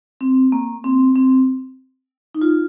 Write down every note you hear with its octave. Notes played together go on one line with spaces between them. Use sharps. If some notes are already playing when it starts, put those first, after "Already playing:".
C4
A#3
C4
C4
D#4
F4